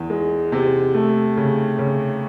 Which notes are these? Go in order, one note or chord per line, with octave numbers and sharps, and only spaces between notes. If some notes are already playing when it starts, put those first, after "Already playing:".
Already playing: E2
G#3
C3
A3
C#3
C#3